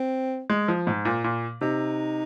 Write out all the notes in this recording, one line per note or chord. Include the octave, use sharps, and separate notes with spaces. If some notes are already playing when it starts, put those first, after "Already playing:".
Already playing: C4
G#3
F3
G#2
A#2
A#2
C3 D#4